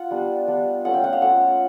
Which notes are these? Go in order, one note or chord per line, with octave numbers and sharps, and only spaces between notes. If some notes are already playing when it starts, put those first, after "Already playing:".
Already playing: F4 F#5
G3 B3 D4
G3 B3 D4
A3 C#4 F4 F#5
G5
F#5
F5
A3 C#4 F4 F#5